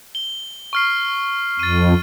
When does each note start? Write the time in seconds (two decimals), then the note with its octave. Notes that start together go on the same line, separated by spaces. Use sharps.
0.15 G7
0.73 C#6 F6 C7
1.59 F2 A6 D#7